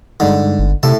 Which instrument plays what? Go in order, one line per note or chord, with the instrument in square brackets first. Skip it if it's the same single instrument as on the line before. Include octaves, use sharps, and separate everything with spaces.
[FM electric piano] G2 G#3 D#4 [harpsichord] D3
[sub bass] G1
[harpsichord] A2 A5 [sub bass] C3 [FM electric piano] A4 E5